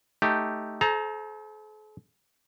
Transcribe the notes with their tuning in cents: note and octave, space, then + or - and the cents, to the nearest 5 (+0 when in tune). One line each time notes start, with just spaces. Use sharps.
A3 +0 D#4 +0 G4 -5
A4 -45 C5 -10 A#5 +5